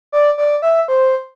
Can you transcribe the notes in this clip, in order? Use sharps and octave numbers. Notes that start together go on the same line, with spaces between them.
D5
D5
E5
C5